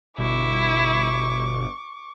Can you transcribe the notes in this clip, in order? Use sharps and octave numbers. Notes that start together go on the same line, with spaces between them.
G1 B2 E4 C#6 D6